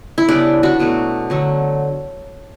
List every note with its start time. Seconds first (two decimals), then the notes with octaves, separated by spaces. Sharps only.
0.18 E4
0.28 C#3 G3 B3 D4
0.63 D4 F#4
0.80 B2 F#3 A3
1.30 D3 F#3 A3